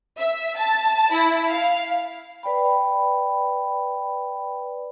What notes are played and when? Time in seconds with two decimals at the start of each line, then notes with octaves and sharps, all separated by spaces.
0.18 E5
0.57 A5
1.12 E4
1.52 F5
2.43 B4 D5 G5 B5